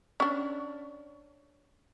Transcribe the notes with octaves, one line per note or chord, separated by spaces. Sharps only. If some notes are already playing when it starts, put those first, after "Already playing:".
C#4 D4